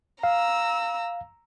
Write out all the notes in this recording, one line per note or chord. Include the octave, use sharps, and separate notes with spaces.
F5 A#5 E6